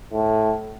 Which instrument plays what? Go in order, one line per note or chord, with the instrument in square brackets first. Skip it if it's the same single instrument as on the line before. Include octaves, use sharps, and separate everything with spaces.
[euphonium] A2